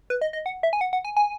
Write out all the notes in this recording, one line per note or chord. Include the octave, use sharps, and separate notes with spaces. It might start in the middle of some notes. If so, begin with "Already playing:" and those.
B4
D#5
D#5
F#5
E5
G#5
F#5
F#5
G#5
G#5